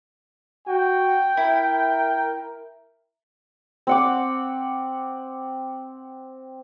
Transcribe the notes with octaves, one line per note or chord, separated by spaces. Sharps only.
F#4 G5
E4 A#4
C4 F#5 D6